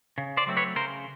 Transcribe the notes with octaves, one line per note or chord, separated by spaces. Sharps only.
C#3
C5 D5
F#3 A3 C4
B4 C#5
C#3 A#4 C5